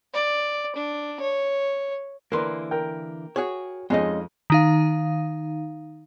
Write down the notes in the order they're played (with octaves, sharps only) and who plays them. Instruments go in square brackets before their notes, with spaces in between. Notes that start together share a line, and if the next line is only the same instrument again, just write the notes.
[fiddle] D5
D4
C#5
[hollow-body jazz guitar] D3 E3 A#3 [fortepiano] A#4 B4 C6
[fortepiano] A#4 G5
[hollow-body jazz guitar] F#4 G#4 C#5
[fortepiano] F2 D#5 [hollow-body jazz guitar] G#3 C#4 D#4
[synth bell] D#3 D#4 F5